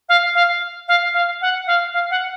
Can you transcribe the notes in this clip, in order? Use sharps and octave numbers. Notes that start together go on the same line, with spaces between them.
F5
F5
F5
F5
F#5
F5
F5
F#5